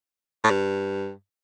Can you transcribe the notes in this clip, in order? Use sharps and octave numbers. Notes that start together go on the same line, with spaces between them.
A2
G2